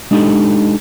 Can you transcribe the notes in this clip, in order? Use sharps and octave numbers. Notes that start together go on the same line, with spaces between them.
G#3 D4 D#4 F#4 G4 A4